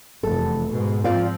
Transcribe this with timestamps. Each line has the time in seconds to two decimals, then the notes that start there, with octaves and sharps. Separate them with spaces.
0.23 F1 E2 A4
0.72 G#2 B2 G#3
1.04 F3 C4 F4 D5 F5